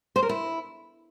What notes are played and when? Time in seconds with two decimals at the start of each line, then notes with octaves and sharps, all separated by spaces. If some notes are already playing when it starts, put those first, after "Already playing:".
0.16 C5
0.23 A#4
0.29 E4